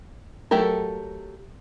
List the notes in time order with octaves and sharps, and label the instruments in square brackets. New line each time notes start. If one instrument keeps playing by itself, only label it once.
[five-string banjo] F#3 A3 G4 A4 A#4